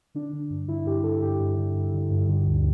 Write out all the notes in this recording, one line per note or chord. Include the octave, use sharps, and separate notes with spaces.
D3 D4
D3
G2
D3 E4
G2 G4
D3 A4
G2 G4
G2
D3
G2
D3
G2
D3
D2